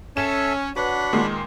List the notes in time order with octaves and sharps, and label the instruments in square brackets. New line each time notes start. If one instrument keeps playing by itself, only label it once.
[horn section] C#4 [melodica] A4 E5 [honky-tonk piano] E7
[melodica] D4 B5 [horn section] F#4 C#5 F#5 [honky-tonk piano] B4
[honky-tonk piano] A#2 D#3 G#3